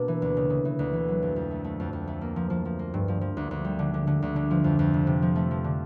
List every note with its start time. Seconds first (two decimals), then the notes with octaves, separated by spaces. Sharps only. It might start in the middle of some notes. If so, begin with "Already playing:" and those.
Already playing: B2 A#3 D4
0.08 E3
0.22 D2
0.37 C#3
0.50 C#3
0.65 E3
0.79 D2
0.93 E3
1.08 F#3
1.23 F2
1.36 F2
1.51 A3
1.64 A3
1.80 F2
1.93 F2
2.07 A3
2.21 A#3
2.36 F3
2.50 F3
2.65 F3
2.79 A#3
2.94 G2
3.08 F3
3.21 F3
3.37 D2
3.51 D2
3.65 G3
3.79 D3
3.94 D3
4.07 D3
4.22 D2
4.36 D3
4.51 F3
4.64 F2
4.79 F2
4.94 C3
5.07 C3
5.22 F3
5.35 A3
5.51 F3
5.64 D3